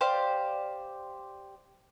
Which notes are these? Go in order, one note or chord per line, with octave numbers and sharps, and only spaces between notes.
G4 C5 D5 F5